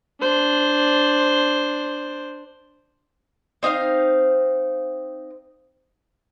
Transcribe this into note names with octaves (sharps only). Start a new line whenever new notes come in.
D4 C5
C4 D#4 C5 F5